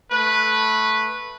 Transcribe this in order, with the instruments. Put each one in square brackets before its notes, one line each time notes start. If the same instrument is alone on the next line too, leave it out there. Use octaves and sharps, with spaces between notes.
[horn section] A3 B4